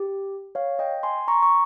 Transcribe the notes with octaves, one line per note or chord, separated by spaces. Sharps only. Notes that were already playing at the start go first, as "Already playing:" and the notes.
Already playing: G4
C#5 F5
D#5 G5
G#5 C6
A#5 C#6
C#6